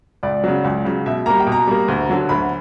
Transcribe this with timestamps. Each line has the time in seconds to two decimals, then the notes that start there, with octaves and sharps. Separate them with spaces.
0.23 C#2 D5
0.44 C#3 F#3
0.64 C#2
0.85 C#3 F#3
1.06 B2 E5
1.26 G3 A#3 A#5
1.40 G5
1.47 B2
1.52 A#5
1.67 G3 A#3
1.88 D2
2.09 D3 F#3
2.29 D2 B5